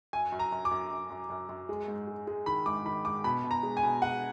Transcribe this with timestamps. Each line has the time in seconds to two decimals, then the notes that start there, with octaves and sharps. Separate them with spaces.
0.13 F#2 G#5
0.32 F#2
0.39 A#5
0.52 F#2
0.65 D6
0.71 F#2
0.91 F#2
1.10 F#2
1.30 F#2
1.49 F#2
1.69 G#3
1.88 G#2
2.07 G#3
2.27 G#3
2.46 D#3 B5
2.66 G#2 D6
2.85 D#3 B5
3.05 G#2 D6
3.24 B2 B5
3.44 B2
3.51 A#5
3.63 G#3
3.77 G#5
3.83 B2
4.02 G#3 F#5